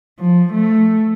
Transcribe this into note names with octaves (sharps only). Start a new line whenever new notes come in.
F3
A3